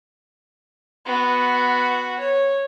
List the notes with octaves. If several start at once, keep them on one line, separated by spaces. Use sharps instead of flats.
B3 F#4
C#5